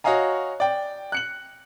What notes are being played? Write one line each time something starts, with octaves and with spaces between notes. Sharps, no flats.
F#4 C#5 D#5 F5 G#5 A#5
D5 G5
F#6 C#7 F#7